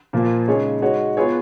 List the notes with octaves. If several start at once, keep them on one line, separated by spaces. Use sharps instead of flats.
A#2 F3 A#3 F4
C#3 G#3 D#4 G#4 C#5
G#3 D#4 F#4 C#5
B3 F4 G#4 C#5